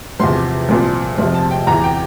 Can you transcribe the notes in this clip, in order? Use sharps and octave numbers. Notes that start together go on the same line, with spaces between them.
E2 C3 F3 C6
C2 A#2 F3
F2 C3 F3
A5
G5
E2 E3 A#5
G5